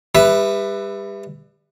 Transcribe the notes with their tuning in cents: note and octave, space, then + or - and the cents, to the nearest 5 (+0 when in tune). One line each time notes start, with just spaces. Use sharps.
G3 +35 B4 +0 E5 +0